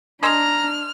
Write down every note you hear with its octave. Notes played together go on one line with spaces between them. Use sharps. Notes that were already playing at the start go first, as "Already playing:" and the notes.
D4 D#5 G#5 A#5 C6 F6